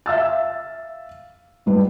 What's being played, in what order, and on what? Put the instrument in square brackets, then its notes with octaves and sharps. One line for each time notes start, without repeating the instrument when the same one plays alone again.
[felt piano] E5 F5 E6 A6
G#2 G3 B4